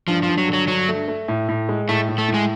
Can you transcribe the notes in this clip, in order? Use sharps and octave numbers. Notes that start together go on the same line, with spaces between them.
G2 F3
F3
G2
F#3
D3
F#3
G2 F#3
A3
A3
A2
A2
G#3
A2 A3
A2
A3
A2
G#3